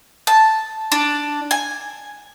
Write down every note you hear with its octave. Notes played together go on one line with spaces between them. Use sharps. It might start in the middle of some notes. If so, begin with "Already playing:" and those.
A5
D4
G#5